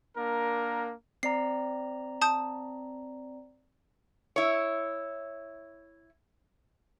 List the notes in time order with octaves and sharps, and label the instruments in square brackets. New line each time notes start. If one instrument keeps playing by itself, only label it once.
[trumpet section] A#3 D4 A#4
[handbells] C4 D5 A#5 [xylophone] C7
[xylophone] A5 D#6 G6
[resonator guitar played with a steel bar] E4 C#5